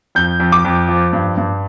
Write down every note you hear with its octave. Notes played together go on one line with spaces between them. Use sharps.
F2 G6
F2
D6
F2
F3
G2
G2